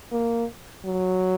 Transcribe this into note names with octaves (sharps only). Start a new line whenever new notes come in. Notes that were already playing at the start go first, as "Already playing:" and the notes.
A#3
F#3